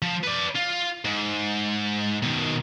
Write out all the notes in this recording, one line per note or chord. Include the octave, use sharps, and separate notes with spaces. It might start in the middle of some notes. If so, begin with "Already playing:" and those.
F3
B4 D5
F4
G#2
B2 D#3